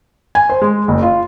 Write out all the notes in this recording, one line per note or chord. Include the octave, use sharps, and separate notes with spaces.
G#5
C5
G#3
F#1
F4